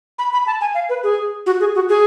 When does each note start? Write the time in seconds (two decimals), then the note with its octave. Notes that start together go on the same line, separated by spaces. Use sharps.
0.19 B5
0.33 B5
0.47 A5
0.61 G#5
0.75 F5
0.89 B4
1.04 G#4
1.46 F#4
1.60 G#4
1.75 F#4
1.89 G#4